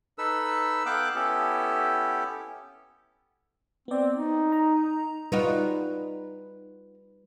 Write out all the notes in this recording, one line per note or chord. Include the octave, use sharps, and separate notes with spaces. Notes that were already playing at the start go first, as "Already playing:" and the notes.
D#4 A4 B4 E6
B3 A4 F5 G5 D6 F#6
B3 C#4 E4 G4 A4
B3 C4 D5
D#4
A#5
G3 D#4 F4 F#4 B4